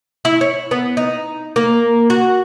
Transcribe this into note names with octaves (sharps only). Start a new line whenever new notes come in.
E4
C#5
B3
D#4
A#3
F#4